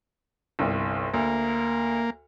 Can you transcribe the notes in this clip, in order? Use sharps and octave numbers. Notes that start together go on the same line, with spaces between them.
G1 C2
D2 A#3